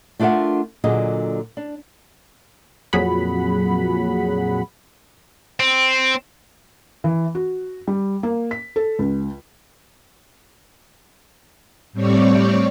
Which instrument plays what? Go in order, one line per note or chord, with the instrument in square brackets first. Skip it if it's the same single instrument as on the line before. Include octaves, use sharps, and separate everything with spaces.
[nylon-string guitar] A3 D4 F4 A#4 E5 F#5
A#2 D3 F#3 F4 G#4 D#5
D4
[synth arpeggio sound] F2 A#2 F#3 G#4 F#5 B5
[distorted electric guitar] C4
[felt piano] E3
F#4
G3
A#3
B6
A4
C#2
[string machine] A2 G3 C4 C#5 D5 C#6